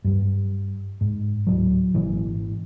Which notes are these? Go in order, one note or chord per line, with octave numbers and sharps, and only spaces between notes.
G2 G3
G#2
D1 C2 F#3
G#1 A#2 E3